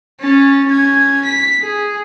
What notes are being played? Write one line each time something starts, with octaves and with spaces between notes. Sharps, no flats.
C#4 A6
C#4 G#6
B6
G#4